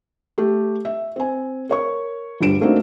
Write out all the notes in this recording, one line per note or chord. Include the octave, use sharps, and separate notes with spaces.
A3 G4
E5
C4 G#5
A#4 C#5 C#6
G1 D2 G3 D7 E7
A3 A#3 C4 D4 D#4 F#4